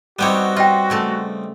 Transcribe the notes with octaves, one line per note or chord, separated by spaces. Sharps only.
G3 B3 C4 D#4 F#4 G4 C#5
F4 E5 G5
C#3 A3 A5